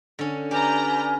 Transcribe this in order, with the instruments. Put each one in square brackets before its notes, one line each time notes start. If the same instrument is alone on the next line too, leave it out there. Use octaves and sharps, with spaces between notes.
[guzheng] D3 C#4
[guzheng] G4 [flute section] B4 G#5 F6 [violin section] D5 A#5 G6